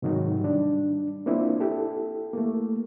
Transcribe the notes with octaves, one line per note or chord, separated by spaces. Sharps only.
G#2 C3 D#3 F#3 D#4
G3 D4
A#3 C4 D4 E4 F4
E4 G4 A4
A3 A#3